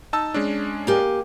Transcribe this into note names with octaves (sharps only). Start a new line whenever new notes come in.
D#4 A5 E6
G#3 C#4 D4
A#3 G4 G#5